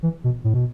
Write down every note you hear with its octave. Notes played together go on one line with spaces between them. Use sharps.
E3
B2
A2
B2